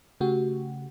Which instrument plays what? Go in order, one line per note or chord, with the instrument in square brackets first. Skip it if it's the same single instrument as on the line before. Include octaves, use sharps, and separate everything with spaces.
[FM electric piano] C#3 A3 F#4 G4